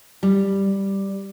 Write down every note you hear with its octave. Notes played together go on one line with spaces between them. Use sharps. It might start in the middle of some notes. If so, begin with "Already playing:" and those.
G3